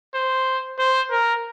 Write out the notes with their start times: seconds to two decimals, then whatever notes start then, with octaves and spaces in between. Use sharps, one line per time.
0.15 C5
0.79 C5
1.11 A#4